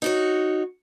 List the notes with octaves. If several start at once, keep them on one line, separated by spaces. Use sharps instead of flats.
D#4 F#4 C#5